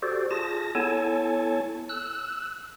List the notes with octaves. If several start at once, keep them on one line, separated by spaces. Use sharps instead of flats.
F#4 G4 A4 C5 D5
F4 G#4 A5 A#6
B3 E4 A4 C#5 G#5 A5
E6 F#6